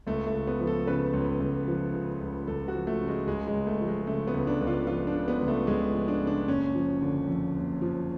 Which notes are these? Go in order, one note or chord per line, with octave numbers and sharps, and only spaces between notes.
C#2 A3
A3
C#2
B3
F3
A4
C#3 B4
C#2
C#2
F3
C#3
C#2
C#2 A4
F#4
F3
A3
C#3
G#3
C#2 G#3
G#3
C#2
A3
F3
G#3
C#3 A3
B3
C#2
D4
C#2
F4
F3 F4
D4
C#3
B3
C#2
A3
C#2 G#3
F3
D4
C#3
D4
F#1 C#4
F3
D3
F2
F#1
F3